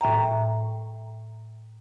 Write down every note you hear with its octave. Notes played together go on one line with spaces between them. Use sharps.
A2 E5 G5 A#5